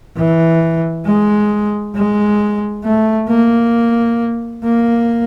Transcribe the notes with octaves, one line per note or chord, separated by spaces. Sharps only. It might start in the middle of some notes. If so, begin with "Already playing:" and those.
E3
G#3
G#3
A3
A#3
A#3